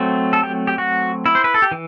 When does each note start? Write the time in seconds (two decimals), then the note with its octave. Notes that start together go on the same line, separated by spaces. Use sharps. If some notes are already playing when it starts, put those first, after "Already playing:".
Already playing: F#3 A3 C4
0.33 A4
0.43 G4
0.67 G4
0.78 F#4
1.26 E4
1.35 C5
1.44 B4
1.54 A4
1.62 G4
1.71 E3